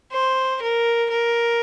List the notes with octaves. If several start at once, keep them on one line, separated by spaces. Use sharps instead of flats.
C5
A#4
A#4